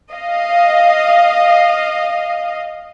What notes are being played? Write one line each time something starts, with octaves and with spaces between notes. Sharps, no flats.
D#5 F5